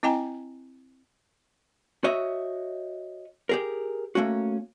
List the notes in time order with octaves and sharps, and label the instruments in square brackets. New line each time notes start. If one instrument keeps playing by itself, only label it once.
[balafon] C4 E4 D#5 G5 G#5 A#5
[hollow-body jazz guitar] F#4 C#5 D#5 E5
G4 G#4 A#4
A3 A#3 C#4 F#4